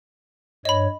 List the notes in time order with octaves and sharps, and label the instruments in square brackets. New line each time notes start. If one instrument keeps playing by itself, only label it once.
[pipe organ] G2 C#5 [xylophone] D#5 B5